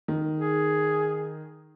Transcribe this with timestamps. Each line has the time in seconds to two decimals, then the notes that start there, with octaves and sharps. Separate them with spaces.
0.08 D#3
0.36 G#4